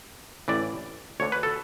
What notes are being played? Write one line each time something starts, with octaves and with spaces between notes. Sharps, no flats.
A1 A2 E3 D5
D2 D3 C#5
B4
A4